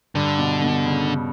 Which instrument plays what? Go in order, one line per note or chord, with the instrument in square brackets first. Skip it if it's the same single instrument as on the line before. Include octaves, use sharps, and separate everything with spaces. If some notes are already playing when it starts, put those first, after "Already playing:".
[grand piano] G2 [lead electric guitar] D3
[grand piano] B2
B2
C#3